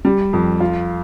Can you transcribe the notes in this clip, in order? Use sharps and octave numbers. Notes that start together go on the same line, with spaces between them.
G3
F2
F4